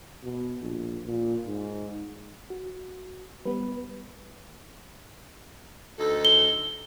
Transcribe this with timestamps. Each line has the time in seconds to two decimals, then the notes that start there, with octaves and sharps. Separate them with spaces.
0.23 B2
0.62 A#1
1.05 A#2
1.46 G#2
2.50 F#4
3.45 G3 B3 B4
5.99 D2 D#4 A4
6.25 G7